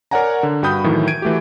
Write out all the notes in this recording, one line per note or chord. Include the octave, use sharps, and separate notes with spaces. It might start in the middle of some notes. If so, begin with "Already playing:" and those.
A#4 C#5 D5 F#5 G#5 A#5
D3
G2 F#4 G5 B5 D#6 G6
A2 D#3 E3 F#3
G#6 D7 D#7
E3 A3 F#4 G4